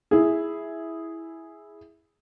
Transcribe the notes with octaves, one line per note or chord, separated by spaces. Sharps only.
E4 G#4